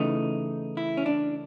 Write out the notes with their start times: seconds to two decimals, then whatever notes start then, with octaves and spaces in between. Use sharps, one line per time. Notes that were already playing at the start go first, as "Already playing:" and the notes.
Already playing: C#3 E3 A3 D#4
0.77 E4
0.97 C#4
1.06 D4